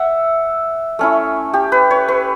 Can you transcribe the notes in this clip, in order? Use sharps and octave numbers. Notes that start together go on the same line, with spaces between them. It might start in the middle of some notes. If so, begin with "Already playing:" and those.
Already playing: E5 F#5
A3 C#4 E4
G4
B4
C#5
B4